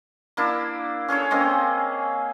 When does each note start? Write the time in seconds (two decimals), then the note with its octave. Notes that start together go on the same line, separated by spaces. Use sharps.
0.37 A#3 D4 E4
1.08 C#4 G#4 A4 C#5
1.31 A#3 C4 C#4 D#5